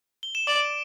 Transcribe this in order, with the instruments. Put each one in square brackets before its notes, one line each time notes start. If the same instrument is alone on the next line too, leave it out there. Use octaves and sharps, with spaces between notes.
[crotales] G7
E7
[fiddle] D5 [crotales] D6 D7